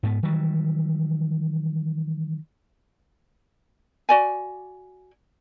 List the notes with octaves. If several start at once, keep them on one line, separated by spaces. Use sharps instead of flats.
G#2 B3
D#3 E3 F#3 G3
F#4 D5 G#5